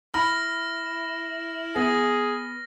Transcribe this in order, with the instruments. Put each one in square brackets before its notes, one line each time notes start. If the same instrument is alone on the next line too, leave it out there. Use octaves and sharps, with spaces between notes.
[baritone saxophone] E4 [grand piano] B5 [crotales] F6 A#6
[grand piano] B3 [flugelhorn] G#4 [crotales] A#6